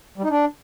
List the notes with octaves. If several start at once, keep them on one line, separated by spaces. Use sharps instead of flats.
G3
D#4
D4